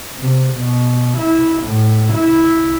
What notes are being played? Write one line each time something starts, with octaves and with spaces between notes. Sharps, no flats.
C3
B2
E4
A2
E4